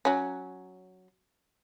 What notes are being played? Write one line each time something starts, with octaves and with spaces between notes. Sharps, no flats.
F#3 C#4